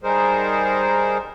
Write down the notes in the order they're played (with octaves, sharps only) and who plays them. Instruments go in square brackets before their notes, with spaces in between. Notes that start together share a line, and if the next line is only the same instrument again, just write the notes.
[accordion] G3 D#4 G#4 A#4 C5